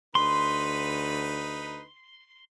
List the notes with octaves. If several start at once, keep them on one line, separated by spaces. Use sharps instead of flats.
D2 D#4 B4 B5 C6